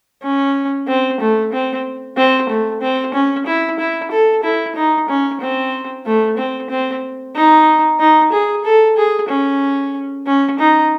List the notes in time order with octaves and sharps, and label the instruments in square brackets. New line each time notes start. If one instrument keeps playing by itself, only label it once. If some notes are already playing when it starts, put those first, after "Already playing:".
[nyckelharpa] C#4
C4
A3
C4
C4
A3
C4
C#4
E4
E4
A4
E4
D#4
C#4
C4
A3
C4
C4
D#4
D#4
G#4
A4
G#4
C#4
C#4
D#4